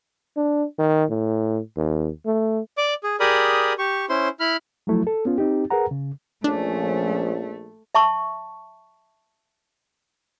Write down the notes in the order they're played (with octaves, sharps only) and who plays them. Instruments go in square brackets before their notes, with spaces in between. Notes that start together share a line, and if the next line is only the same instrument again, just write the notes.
[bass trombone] D4
D#3
A2
D#2
A3
[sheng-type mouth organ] D5 D6
G#4
G4 G#4 A#4 D5 B5 D#6
G4 C#6
C#4 E4 C5 C6
E4 B5 F6
[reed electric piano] F3 F#3 A3 E4
A4
B3 C#4 F4
C4 D#4 G4
G#4 A#4 B4 F#5 A#5
C#3
[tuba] A#1 [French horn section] F3 C#4 [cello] A3 [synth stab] D4
[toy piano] E5 A5 C#6